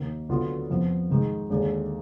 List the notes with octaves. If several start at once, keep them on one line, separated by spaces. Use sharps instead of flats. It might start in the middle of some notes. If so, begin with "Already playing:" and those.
Already playing: D#2 D#3 A#3
D2 D3 F#3 B3 F4
F2 F3 B3
G#2 D#3 G#3
D#2 D3 G#3 D4 G#4